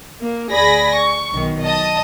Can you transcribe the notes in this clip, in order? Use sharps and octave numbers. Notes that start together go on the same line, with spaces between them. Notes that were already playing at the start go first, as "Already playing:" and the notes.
A#3
D2 G#4 D5 G#5 B5 A#6
C#6
B1 D#3
D#5 A5 D#6